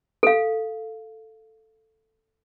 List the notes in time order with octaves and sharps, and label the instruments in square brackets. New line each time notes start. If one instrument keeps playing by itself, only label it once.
[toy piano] A4 F5